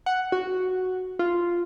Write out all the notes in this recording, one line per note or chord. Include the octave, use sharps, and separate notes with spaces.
F#5
F#4
F4